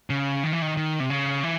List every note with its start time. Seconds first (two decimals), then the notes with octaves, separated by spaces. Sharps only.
0.10 C#3
0.43 D#3
0.53 E3
0.62 D#3
0.77 D#3
1.00 C3
1.10 C#3
1.43 E3